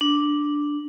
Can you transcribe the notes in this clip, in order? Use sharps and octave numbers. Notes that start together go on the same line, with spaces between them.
D4